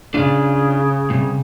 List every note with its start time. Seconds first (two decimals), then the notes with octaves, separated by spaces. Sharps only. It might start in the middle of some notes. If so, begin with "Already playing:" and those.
0.14 C#3 D4 F4
1.10 A2 C3 G3